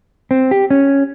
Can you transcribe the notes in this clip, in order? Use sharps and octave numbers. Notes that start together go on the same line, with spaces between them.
C4
G4
C#4